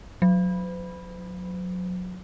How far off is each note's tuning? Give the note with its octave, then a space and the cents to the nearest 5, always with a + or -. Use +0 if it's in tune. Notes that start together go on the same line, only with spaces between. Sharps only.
F#3 -25